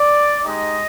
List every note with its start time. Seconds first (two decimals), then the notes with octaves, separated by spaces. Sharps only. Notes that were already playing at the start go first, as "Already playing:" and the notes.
Already playing: D5
0.45 G#3 D#4 G4 D#5